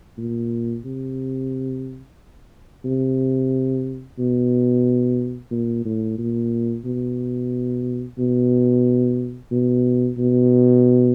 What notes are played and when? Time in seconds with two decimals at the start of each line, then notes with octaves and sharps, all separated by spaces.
0.18 A#2
0.85 C3
2.85 C3
4.19 B2
5.51 A#2
5.85 A2
6.18 A#2
6.85 B2
8.19 B2
9.52 B2
10.18 B2